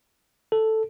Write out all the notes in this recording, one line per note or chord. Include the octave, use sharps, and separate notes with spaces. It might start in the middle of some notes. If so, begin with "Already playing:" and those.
A4